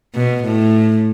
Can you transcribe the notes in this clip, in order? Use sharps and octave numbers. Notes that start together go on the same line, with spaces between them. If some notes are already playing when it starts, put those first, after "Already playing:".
B2
A2